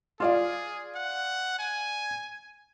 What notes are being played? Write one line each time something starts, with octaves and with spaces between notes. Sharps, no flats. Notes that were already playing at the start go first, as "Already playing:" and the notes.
F4 G#4 D5 F5
F#5
G#5